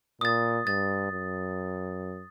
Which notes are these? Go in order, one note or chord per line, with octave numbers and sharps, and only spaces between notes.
A#2 D#6 A6
G2 A6
F#2